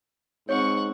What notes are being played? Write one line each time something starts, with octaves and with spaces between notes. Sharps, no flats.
G#2 C4 C#5 F#5 C#6